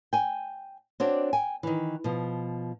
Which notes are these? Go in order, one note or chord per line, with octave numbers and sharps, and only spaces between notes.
G5 G#5
C4 D4 F#4 C#5 D5
G5 G#5
D#3 E3
B2 F3